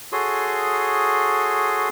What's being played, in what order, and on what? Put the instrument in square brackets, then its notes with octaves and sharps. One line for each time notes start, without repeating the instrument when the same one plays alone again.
[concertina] F#4 G#4 A4 C#5 C6 D#6